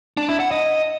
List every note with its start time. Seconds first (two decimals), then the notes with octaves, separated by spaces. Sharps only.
0.17 D4
0.29 E4
0.40 F#5
0.51 D#5